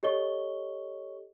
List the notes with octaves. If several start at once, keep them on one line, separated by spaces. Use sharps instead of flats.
G4 A4 C#5 D#5 C#6 G7